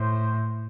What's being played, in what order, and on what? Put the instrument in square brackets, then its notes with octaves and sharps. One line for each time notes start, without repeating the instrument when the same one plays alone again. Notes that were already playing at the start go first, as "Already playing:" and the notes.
Already playing: [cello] A2 [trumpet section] C5